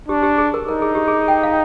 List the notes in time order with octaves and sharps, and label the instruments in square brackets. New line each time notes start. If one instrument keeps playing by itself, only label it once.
[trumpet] D4 [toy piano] G4
[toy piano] G4
G#4
A#4
[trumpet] D#4 [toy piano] A#4
[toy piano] G#4
G4
G#4
G5
F5